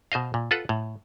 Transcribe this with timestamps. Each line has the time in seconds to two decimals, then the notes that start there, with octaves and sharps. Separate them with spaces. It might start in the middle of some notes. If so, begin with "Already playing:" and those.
0.12 B2 C5 D#5 F5
0.34 A#2
0.51 F4 A4 B4 F#5
0.69 A2